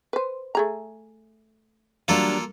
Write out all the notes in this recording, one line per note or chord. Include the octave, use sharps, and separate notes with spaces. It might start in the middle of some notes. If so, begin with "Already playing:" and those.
B4 C5
A3 G#4 A#5
F#3 G3 A#3 D4 F4 A4